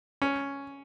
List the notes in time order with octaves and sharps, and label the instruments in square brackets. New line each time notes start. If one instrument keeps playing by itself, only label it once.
[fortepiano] C#4